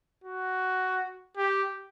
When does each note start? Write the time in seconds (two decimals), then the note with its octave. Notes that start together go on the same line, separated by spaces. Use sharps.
0.24 F#4
1.38 G4